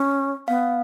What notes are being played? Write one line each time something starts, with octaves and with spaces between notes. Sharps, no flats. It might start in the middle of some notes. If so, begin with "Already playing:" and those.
Already playing: C#4
B3 F5